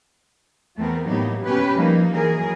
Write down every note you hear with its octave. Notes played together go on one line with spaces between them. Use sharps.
E2 A3 B3 C4 A#4
A2 F#3 A#3 B3 D#4 G4
B2 C#4 G4 B4
F3 G3 A#3 D#4
E3 F#3 G#4 A#4